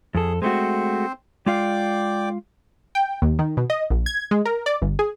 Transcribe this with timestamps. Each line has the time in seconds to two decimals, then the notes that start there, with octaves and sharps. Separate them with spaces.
0.15 F2 G#4 A4
0.42 G#3 A3 C4 F#4 C5
1.46 G#3 F4 D5 F5 G5 D6
2.95 G5
3.22 D#2
3.39 D#3
3.57 B2
3.70 D#5
3.90 A#1
4.06 G#6
4.31 G#3
4.45 A#4
4.66 D5
4.82 G1
4.99 G#4